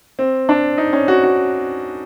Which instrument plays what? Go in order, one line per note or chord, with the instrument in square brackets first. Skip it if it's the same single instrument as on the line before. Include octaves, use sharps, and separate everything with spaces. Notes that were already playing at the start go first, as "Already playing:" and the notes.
[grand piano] C4
D4
D#4
C#4
F#4
F#4